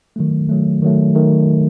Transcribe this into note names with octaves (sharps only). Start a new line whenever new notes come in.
D#3 F#3 A3
D#3 F#3 A3
D#3 F#3 A3
D#3 F#3 A3